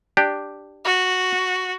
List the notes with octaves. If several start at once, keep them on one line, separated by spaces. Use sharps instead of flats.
D4 G4
F#4